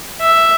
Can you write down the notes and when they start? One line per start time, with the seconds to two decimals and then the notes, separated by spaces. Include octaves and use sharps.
0.22 E5